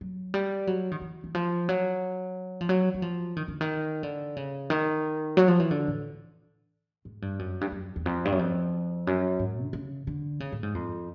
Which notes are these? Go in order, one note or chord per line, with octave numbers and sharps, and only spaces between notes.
F#3
G3
F#3
D#3
E3
E3
F3
F#3
F3
F#3
F#3
F3
D#3
D3
D#3
D3
C#3
D#3
F#3
F3
E3
D3
A2
G#2
G2
F#2
G2
F#2
E2
F2
G2
F#2
F2
F#2
G#2
D3
C#3
D3
C#3
A2
G#2
F2